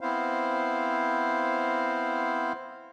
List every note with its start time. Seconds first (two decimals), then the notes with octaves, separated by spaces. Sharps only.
0.01 B3 C4 E4 C5 F5